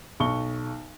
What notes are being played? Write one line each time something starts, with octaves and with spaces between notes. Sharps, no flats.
B1 C#6 G7